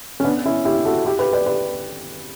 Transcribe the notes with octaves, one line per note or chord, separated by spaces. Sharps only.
C#4
B3 D4
C#4 E4
E4 G4
F#4 A4
E4 G4
G4 B4
B4 D5
G4 B4